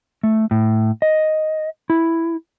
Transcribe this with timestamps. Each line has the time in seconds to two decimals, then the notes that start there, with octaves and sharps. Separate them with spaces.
0.23 A3
0.51 A2
1.02 D#5
1.90 E4